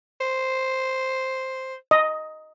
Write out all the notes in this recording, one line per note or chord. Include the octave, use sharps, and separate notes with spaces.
C5
D#5